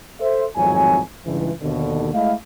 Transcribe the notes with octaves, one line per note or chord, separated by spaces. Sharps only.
A4 C5 E5
G#1 F2 A2 F#3 G#5
C#2 G2 E3
D#2 B2 D3
G#3 A3 E4 A4 D#5 F5